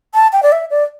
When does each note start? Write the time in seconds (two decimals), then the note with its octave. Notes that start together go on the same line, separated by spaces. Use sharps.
0.14 A5
0.33 G5
0.43 D5
0.52 E5
0.70 D5